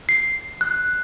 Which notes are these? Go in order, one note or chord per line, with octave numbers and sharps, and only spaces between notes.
C7
F#6